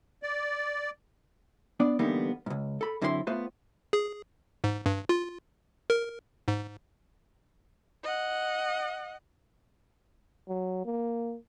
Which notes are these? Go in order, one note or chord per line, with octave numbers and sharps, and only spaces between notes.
D5
B3 D4 D5
D3 E3 G3 A#3 B3 D#4
C#2 G#2
A4 B5
F#2 D3 C4 E4 B4 C6
A3 B3 F4 B4 C5
G#4
G#2
G2
F4
A#4
G#2
D#5 F#5
F#3
A#3